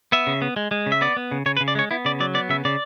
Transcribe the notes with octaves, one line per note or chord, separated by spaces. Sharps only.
B3 E5
C#3
B3
G#3
G#3
C#3
E5
B3 D5
B3
C#3
C#3 C#5
B4
C#3
D5
G#3 C#5
B3 E4
C#3 D5
F#3 D5
B3 D5
C#3 E5
C#3 D5